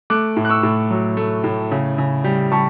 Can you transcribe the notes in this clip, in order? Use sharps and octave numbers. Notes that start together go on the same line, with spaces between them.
A3 D6 F#6
A2
F#6
C#6 E6
A2
F#3
A3
A2
C#3
C#3
G3
G3 A5 C#6